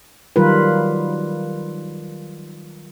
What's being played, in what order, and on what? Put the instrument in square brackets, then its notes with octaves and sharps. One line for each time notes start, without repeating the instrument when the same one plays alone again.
[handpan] D#3 F#3 G3 F4 A#4 B4